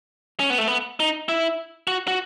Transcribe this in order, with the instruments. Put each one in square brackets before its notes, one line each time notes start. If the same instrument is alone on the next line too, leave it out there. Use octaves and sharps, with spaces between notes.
[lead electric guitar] C#4
B3
A3
B3
D#4
E4
F#4
F#4